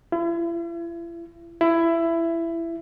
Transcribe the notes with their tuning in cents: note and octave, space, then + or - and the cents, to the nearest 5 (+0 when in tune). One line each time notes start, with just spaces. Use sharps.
E4 +40
E4 +15